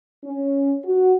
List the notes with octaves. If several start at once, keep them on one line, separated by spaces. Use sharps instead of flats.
C#4
F#4